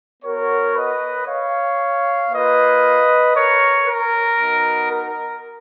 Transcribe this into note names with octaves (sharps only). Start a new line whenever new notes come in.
B3 F#4 A#4 C#5
B4 D#5
C#5 F5
A#3 F4 B4 D#5
A#4 C#5
A#4
B3 D#4 F#4
A#4